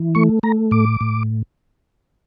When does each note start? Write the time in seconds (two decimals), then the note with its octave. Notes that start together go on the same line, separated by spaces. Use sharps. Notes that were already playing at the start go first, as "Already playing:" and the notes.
Already playing: E3
0.15 A3 C#6
0.43 A3 A#5
0.71 A2 D6
1.01 A2